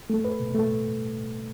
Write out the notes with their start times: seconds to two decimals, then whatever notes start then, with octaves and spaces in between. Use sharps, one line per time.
0.10 A3
0.25 B4
0.40 B2
0.55 A3